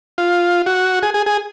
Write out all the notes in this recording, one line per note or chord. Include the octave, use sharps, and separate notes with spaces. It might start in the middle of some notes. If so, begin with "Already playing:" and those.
F4
F#4
G#4
G#4
G#4